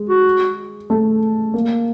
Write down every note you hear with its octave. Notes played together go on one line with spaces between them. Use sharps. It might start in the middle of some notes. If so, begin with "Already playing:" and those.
Already playing: G#3
F#4
A3
A#3